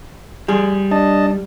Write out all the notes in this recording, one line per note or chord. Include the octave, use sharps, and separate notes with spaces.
G3 G#4
D4 D#5 A5